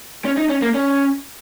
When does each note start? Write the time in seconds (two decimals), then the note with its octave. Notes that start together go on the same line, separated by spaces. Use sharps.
0.25 C#4
0.37 D#4
0.49 C#4
0.62 A#3
0.74 C#4